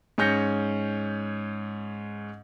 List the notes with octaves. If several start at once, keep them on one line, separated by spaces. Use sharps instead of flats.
G#2 C#4 G6 A#6 C#7